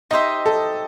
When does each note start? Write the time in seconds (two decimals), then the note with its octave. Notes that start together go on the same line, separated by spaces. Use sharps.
0.11 D#4 G4 C5 D#5 E5
0.46 A4